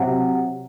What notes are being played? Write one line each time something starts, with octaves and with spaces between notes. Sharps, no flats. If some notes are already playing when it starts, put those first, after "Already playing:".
Already playing: C3 F#3